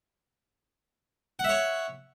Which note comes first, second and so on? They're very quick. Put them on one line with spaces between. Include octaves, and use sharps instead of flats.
F#5 E5 C#5